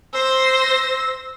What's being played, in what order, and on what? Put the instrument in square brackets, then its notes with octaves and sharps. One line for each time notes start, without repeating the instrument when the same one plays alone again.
[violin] C5 A#6 [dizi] E6